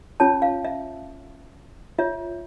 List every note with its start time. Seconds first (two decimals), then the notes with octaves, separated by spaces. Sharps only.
0.20 C#4 F4 C#5 A5
0.42 F5
0.65 E5
1.99 F4 C#5 E5